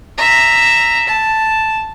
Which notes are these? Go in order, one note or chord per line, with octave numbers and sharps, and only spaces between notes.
E5 A#5
A5